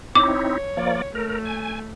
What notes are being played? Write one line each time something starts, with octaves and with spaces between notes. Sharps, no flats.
C4 D#4 E4 C#5 D6
F3 A#3 D5
A3 A#4
G#5